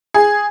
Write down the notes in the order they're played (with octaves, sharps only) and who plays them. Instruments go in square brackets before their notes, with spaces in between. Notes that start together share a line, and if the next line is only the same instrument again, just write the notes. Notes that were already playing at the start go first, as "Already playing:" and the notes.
[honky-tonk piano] G#4